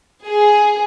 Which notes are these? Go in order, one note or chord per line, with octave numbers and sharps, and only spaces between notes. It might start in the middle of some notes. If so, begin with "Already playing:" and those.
G#4